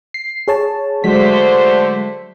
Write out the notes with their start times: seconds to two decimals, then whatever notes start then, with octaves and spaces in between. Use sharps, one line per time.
0.14 C7
0.48 G#4 C#5 A5
1.04 D3 F#3 G#3 A3 C5 B6